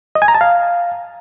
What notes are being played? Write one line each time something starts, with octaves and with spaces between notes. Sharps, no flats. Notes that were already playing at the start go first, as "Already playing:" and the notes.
D#5
G#5
A#5
A5
F5